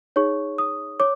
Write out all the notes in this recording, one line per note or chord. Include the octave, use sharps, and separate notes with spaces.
D#4 G#4 C#5 C#6
D#6
C#5 D6